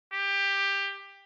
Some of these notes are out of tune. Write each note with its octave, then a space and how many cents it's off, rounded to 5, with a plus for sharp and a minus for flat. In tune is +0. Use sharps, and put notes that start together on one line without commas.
G4 +15